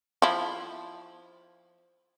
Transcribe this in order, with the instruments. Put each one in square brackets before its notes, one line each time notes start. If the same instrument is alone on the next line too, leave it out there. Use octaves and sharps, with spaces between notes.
[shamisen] F3 E4